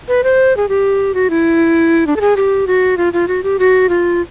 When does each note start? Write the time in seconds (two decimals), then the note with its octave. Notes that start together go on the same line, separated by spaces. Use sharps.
0.08 B4
0.24 C5
0.57 G#4
0.69 G4
1.14 F#4
1.30 E4
2.07 D4
2.16 A4
2.21 G#4
2.37 G4
2.67 F#4
2.97 F4
3.13 F4
3.28 F#4
3.43 G4
3.59 F#4
3.89 F4